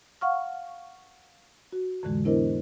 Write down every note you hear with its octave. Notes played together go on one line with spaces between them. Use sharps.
F5 F#5 C#6 F6
F#4
F2 A2 D3 E3 G#3
B3 D4 E4 A#4 C5 D#5